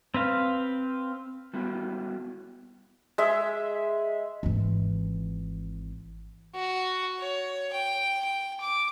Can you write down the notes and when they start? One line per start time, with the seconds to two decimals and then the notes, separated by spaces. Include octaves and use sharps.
0.14 C4 B4 F5
1.53 G3 B3 E4 F#4
3.18 G#3 E5
4.43 G#1 E3
6.55 F#4
7.19 C#5
7.73 G5
8.25 G5
8.61 D6